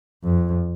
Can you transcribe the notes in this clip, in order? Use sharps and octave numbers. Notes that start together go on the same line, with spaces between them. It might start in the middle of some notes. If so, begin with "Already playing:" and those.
F2